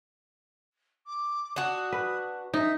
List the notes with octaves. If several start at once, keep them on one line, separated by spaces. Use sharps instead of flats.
D6
D4 F#4 D#6
B4
D#4 E5